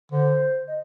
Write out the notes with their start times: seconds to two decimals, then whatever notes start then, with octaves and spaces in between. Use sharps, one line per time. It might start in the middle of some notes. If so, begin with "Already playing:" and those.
0.11 D3 C5
0.67 D#5